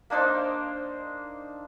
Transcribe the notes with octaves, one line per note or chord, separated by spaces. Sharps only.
A#3 D4 D#4 C5